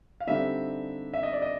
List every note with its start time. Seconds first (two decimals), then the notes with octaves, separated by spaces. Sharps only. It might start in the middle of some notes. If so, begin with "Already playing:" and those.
0.20 F5
0.27 D3 G3 C4 D#4 E5
1.14 E5
1.23 D#5
1.33 D5
1.42 D#5